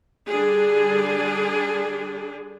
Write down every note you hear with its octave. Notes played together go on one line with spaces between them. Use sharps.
D3 G3 D4 G#4